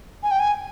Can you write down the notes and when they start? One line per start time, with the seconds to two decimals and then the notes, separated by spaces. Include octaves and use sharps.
0.23 G#5
0.31 G5
0.39 G#5